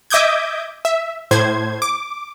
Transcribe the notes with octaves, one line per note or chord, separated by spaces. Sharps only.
D#5 E5 D6 D#6 G6 G#6
E5
A2 C5 G#6
D6